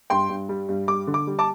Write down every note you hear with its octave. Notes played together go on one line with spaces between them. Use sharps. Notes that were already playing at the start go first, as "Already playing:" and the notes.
G2 G5 C6
G2
G3
G2
G3 D6
D3
D6
G3
A5 D6